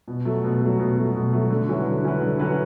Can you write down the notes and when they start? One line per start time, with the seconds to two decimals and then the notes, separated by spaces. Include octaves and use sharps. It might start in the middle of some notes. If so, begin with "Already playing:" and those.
0.08 B2
0.25 F#3 A3
0.44 B2
0.61 F#3 A3
0.79 B2
0.97 F#3 A3
1.15 B2
1.33 F#3 A3
1.50 D3
1.69 F#3 C#4 E4 B4
1.86 D3
2.04 F#3 C#4 E4 B4
2.22 D3
2.39 F#3 C#4 E4 B4